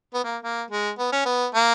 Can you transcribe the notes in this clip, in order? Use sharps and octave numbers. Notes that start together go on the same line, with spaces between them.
B3
A#3
A#3
G#3
B3
C#4
B3
A#3